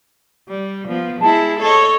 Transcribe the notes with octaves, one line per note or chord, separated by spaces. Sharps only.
G3
F3 B3
G#3 E4 A5
A4 C#5 D#5